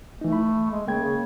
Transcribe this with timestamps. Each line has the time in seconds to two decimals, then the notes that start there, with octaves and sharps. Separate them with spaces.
0.21 E3 A3 D#4
0.33 B5
0.71 G#3
0.87 C#3 A#3 G5 G#6
1.03 C#3